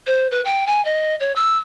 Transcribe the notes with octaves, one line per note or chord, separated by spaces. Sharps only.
C5
B4
G5
G#5
D#5
C#5
E6